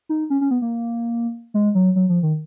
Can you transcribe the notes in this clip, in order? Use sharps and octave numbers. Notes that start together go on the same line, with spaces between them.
D#4
C#4
C#4
B3
A#3
G#3
F#3
F#3
F3
D#3